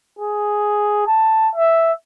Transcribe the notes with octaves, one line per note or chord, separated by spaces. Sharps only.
G#4
A5
E5